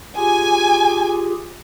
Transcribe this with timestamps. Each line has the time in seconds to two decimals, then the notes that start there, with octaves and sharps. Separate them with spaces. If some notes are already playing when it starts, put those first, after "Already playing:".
0.17 F4 G4 G#4 G#5